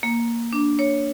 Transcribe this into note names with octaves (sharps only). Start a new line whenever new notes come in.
A#3
D4
C#5